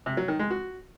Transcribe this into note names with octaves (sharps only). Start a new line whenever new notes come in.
C3
F#3
D#3
G#3
F#4